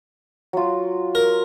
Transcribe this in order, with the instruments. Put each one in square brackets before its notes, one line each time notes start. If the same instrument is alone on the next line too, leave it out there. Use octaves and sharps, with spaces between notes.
[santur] F#3 F4
[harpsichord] A#4